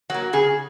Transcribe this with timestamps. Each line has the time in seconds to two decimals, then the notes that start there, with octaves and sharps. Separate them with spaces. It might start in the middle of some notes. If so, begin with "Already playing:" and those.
0.10 F#3 A#3 F#4
0.33 C#3 G#4